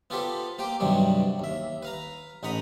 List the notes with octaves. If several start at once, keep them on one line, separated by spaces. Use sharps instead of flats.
B3 F4 G4 A4 B4 C5
A#3 G4 C5 G5
G2 C3 D#3 F#3 G3 B3
D#2 E5
B4 F5 A#5
A1 D#4 F#5 A#5 B5 D#6